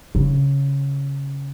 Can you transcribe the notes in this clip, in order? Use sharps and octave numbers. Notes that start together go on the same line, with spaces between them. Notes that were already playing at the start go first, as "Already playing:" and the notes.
C#3